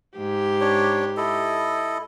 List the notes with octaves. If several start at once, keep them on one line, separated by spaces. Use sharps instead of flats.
G#2 G4
D4 C#5
E4 A4 D#5